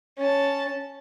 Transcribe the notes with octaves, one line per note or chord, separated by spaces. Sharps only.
C#4 A5